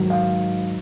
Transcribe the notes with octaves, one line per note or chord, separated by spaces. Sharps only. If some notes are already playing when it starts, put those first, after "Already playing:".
Already playing: G#2 D#3 F#3
F5